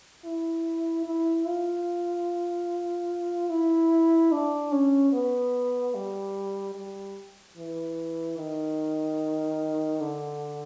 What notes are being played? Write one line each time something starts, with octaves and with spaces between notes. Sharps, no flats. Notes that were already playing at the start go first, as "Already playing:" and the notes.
E4
E4
F4
E4
D4
C#4
B3
G3
G3
E3
D#3
D3